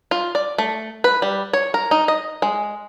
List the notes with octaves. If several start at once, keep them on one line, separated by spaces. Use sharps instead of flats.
F4
D5
A3
B4
G3
C#5
A#4
D#4
D#5
G#3